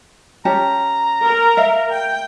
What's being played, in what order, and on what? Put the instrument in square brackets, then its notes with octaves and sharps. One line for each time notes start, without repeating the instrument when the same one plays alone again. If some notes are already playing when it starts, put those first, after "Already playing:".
[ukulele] C#4 G4 A5 [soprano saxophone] A#5
[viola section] A#4
[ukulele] E5 F5
[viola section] G5